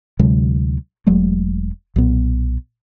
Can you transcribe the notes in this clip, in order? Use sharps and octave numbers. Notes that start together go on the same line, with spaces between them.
D2 C3 F#3 G#3
E1 F#3 G#3 A3
B1 A#2 B3